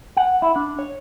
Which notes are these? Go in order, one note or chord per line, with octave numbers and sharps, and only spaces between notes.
F#5
E4
D4
C#5